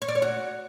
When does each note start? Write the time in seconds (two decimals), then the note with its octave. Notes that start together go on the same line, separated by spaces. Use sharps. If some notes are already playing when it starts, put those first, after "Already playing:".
0.02 C#5
0.08 D5
0.15 C#5
0.22 F#4